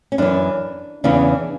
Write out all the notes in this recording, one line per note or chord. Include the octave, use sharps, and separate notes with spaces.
C#4
F#2 E3 D4
E2 C#3 E3 D4